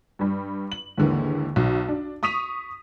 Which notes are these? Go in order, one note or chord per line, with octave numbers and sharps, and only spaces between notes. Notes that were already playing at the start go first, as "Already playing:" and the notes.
G2 G3
F#7
D#2 G#2 D3 E3 A#3
B1
D4
C#6 D#6 B6 D#7 F7